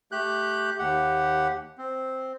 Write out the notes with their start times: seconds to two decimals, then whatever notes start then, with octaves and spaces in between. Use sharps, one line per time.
0.12 A3 G4 F#6 G6
0.79 D#2 G4 F#5
1.78 C4